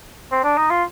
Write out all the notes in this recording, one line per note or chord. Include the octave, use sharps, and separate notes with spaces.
C4
D4
D#4
F4